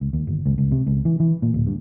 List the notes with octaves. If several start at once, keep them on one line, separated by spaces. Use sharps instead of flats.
C#2
D#2
G1
C#2
C#2
C3
C#2
E3
E3
A#2
D1
G2